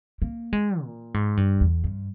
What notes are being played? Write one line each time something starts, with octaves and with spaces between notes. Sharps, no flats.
A#3
G#3
A#2
G#2
G2
E2
G2